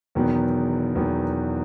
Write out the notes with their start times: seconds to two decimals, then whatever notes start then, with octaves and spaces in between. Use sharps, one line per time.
0.15 E1 E2 D#3 F#3 B3
0.95 E1 E2 D#3 F#3 B3